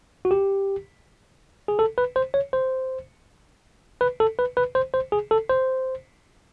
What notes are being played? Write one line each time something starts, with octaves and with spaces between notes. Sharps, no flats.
F#4
G4
G#4
A4
B4
C5
C#5
C5
B4
A4
B4
B4
C5
C5
G#4
A4
C5